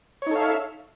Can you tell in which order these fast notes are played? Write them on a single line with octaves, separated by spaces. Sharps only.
C#5 D#4 A4 F5 E5